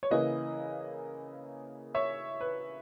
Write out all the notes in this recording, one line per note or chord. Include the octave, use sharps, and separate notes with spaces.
C#5
C#3 E3 A#3 E4 B4 D#5
C#5 E5
B4